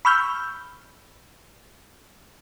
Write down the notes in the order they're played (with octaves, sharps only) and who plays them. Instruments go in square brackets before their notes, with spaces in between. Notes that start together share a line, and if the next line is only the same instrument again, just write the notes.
[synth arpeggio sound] B5 C#6 E6 F6 G6